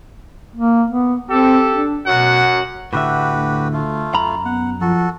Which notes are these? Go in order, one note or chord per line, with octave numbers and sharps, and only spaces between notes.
A#3
B3
C4 G4 A4
D4
F#2 B2 F#4 F#5
A2 D3 F#4 G4 B4 E5
D2
A3 F4
F#2 A#5 B5
B3 F#5
F3 F#4 A4